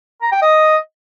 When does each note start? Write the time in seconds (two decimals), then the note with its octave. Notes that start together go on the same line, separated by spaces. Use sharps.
0.22 A#5
0.32 G5
0.42 D#5